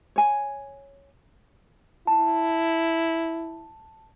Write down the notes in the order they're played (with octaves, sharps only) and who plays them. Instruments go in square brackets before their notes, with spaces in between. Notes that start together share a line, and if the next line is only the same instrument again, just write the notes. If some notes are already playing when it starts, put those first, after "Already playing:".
[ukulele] C#5 G#5
[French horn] E4 [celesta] A5